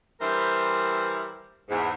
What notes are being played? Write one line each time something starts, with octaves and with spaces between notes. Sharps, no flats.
E3 G3 A#4 C5
E2 G#2